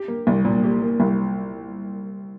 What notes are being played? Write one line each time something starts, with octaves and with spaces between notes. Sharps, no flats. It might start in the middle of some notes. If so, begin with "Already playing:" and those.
Already playing: G4
A#3
C2
A#2
G4
A#3
C2